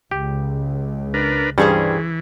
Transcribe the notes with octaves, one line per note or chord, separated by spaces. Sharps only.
C#2 G4
D4 A#4 B4
G2 E3 G3 C#4 G#4 C5